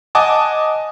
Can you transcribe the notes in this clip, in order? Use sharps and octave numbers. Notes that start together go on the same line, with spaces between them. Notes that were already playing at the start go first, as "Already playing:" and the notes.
D#5 F#5 G#5 A5 D6 D#6